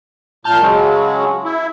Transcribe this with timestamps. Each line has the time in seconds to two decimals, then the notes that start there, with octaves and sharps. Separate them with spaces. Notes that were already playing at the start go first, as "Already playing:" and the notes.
0.45 A#2 A5 F6 G6
0.60 C#3 F#3 G#3
1.44 E4